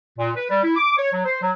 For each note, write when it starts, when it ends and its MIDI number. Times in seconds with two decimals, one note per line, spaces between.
0.18 0.30 46
0.36 0.50 71
0.50 0.59 55
0.63 0.75 64
0.76 0.97 86
0.98 1.11 73
1.13 1.25 54
1.26 1.40 72
1.42 1.52 54